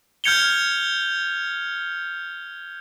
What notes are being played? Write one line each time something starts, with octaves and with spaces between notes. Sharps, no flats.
F6 G6 G#6 C#7 F7 G7